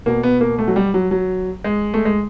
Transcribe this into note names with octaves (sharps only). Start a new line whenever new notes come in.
B2 A#3
B3
A#3
A3
F#3
G3
F#3
F#3
G#3
A3
G#3